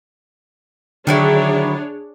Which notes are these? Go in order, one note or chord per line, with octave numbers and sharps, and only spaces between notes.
D3 D#3 F#3 D4 E4 G#4 C#5